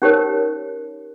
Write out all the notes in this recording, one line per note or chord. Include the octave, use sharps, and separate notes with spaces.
C#4 D#4 G4 A#4 C5 C#5